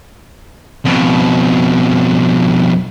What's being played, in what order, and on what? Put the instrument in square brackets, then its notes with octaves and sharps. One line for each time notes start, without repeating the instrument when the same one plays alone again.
[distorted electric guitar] F2 B2